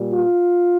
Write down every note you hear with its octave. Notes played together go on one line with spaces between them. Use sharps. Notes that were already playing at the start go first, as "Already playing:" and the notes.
Already playing: A#2 G3
F4